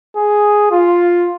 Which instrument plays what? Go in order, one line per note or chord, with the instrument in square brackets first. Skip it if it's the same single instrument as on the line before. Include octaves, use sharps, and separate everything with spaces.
[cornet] G#4
F4